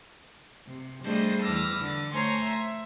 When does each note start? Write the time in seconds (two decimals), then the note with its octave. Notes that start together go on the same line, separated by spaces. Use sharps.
0.68 C3
1.04 G3 A3 D4 G#4 C5 D#5
1.42 E2 B4 D6 E6 F6 A#6
1.80 D3 D6
2.13 A3 C5 C#5 G#5 A#5 C6
2.43 E5